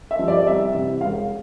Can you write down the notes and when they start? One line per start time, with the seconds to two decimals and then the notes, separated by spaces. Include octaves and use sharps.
0.11 E5
0.19 G2 F3
0.28 D5
0.38 D5
0.46 C2 E5
0.74 C3 E3
1.01 E1 F5